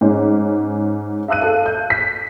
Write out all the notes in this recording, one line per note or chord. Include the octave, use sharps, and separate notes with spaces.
G#2 C#4
E5 F5 E6 F#6 D#7
A4 F5
G6
B6